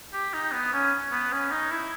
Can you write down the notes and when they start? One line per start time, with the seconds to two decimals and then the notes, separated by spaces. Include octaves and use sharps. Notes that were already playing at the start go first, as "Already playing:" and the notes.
0.13 G4
0.33 D#4
0.52 B3
0.73 C#4
1.11 B3
1.32 C#4
1.51 D#4
1.71 E4